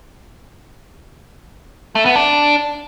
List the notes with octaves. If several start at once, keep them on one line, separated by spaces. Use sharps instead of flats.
A3
B3
D4